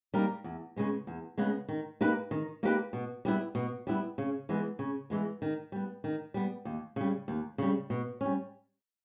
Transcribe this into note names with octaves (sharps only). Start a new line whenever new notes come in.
G3 A#3 D#4 A#4
E2
C#3 G#3 B3
E2
C#3 G#3 B3
D#3
A#3 D#4 G4 B4
D#3
A#3 D#4 G4 B4
B2
G3 B3 E4
B2
G3 B3 E4
C#3
E3 G#3 B3
C#3
E3 G#3 B3
D#3
G3 B3
D#3
G3 B3
D#2
C#3 G3
D#2
C#3 G3
B2
G3 C#4